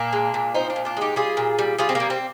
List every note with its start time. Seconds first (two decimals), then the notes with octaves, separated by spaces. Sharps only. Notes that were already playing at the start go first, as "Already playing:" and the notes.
Already playing: A#2 A#3 D4
0.13 G#3
0.34 A#2
0.54 F3 C4 D#4
0.70 D4 F4
0.76 A#2
0.85 D4 F4
0.97 G#3 D#4 G4
1.16 G3 F4 G#4
1.37 A#2
1.59 G3
1.78 G3 F4 G#4
1.89 C4
1.95 G3 A#3
2.10 C4